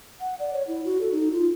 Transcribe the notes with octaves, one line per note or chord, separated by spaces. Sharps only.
F#5
D5
C#5
E4
F#4
A4
D#4
F4